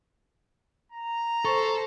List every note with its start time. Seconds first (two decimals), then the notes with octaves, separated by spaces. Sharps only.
0.92 A#5
1.45 A4 C5 C#6